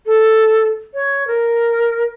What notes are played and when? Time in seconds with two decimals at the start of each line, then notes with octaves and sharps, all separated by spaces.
0.06 A4
0.94 C#5
1.27 A#4